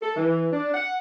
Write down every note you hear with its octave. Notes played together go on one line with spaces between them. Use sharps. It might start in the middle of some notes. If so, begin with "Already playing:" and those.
A4
E3
D4
F#5